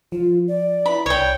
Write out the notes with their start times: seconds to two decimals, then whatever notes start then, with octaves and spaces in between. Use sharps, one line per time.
0.12 F3 F4
0.48 D5
0.86 E4 B4 B5
1.06 C2 C#5 D5 G5